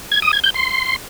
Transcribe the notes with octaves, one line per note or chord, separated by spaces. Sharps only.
G#6
D#6
G#6
G6
C6